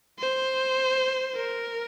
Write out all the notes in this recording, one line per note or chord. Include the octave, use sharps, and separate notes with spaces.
C5
A#4